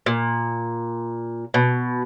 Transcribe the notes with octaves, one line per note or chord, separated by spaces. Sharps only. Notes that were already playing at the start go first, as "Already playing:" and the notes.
A#2
B2